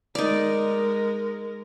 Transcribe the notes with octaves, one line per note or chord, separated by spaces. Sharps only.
G#3 D#4 A#4 D5